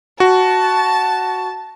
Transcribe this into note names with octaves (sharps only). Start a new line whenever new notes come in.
F#4 A5